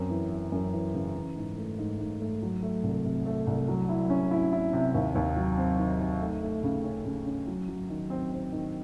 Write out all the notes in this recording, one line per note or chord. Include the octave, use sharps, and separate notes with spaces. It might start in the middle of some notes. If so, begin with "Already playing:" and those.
Already playing: F#2 C4
E3
E3
F#2
E3
C#3
E3
G#2
A3
G#2
G#2
A3
F#3
A3
C2
C3
A3
C2
F#3
E4
C#4
E4
E4
C3
D#2
D#2
F#3
C4
D#3
D#3
A3
A3
C#3
C#4
C#3
C#4
F#3
F#3
D#3
C4
C4
D#3